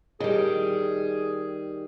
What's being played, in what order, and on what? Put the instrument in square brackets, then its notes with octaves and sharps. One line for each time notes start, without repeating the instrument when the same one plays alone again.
[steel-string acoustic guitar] D#3 G3 [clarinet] G#4